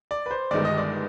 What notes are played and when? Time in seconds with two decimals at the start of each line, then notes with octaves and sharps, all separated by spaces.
0.11 D5
0.26 B4
0.31 C5
0.51 G1 G2 D#3 G#3 B3 D5
0.65 D#5
0.77 D5